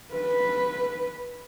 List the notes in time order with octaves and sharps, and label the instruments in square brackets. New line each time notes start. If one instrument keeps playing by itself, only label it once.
[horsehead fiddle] B4